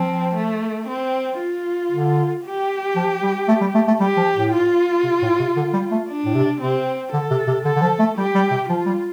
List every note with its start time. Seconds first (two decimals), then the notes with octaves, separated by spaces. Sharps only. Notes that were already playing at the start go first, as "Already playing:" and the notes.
Already playing: F3 C4
0.35 A3
0.87 C4
1.39 F4
1.91 D3
2.44 G4
2.96 F3
3.23 G3
3.48 A3
3.61 G3
3.75 A3
3.87 A3
4.00 G3 G4
4.17 F3
4.35 A2
4.52 F4
5.04 C3
5.22 A2
5.40 C3
5.57 D3
5.74 G3
5.91 A3
6.09 D4
6.25 A2
6.35 C3
6.60 C3 C4
7.12 D3 A4
7.31 C3
7.47 C3
7.65 D3 A4
7.76 D3
7.82 F3
7.99 A3
8.17 G3 G4
8.35 G3
8.51 C3
8.68 F3 F4
8.86 G3